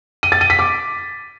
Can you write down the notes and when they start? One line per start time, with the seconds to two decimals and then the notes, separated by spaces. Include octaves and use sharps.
0.23 D#7
0.32 A6
0.41 D#7
0.50 B6
0.59 D6